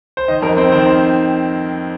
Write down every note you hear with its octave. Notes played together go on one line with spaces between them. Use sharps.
C5
D#3 D#5
F2 A#4
C4 C5
D#3 C5
C4